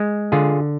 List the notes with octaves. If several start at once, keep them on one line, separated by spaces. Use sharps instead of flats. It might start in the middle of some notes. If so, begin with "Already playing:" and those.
Already playing: G#3
D3 F4 G#4